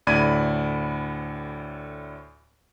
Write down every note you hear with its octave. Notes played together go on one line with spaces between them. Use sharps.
D2 A2 D5 B5 G#6 D#7